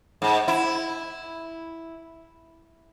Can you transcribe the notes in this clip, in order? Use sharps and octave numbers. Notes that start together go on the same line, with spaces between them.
G#2
E4